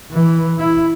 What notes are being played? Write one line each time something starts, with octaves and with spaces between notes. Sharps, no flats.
E3
E4